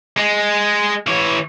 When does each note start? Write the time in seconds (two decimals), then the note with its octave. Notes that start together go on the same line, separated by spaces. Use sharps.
0.17 G#3
1.07 E3 C#5